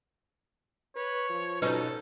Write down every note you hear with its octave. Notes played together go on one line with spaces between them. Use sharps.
B4 C#5
F3
B2 C#4 D#4 A4 B4 C#5